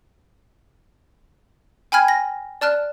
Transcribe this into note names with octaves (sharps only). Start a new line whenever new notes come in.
G5 G#5 B5 F6 G#6
A#6
D5 A5 F6 F#6